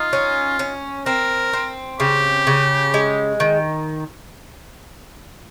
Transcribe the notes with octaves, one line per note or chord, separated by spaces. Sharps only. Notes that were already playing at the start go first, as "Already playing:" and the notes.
Already playing: D#4 F4
C#4
C#4
C4 A#4
C4
C#3 G4
C#3
G#3
D#3